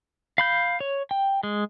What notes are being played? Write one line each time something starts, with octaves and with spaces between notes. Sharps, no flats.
F5 B5 G6
C#5
G5
G#3